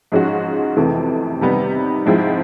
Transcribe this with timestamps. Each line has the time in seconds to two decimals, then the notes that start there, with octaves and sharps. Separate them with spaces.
0.12 G#2 F3 G#3 C#4 F#4
0.76 F2 C3 E3 A3
1.41 C3 D#3 G3 B3 D#4
2.06 G#2 F3 G#3 C4 E4